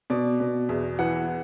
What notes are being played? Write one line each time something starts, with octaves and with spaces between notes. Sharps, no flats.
B2 D5
B2
E2
E3 F#5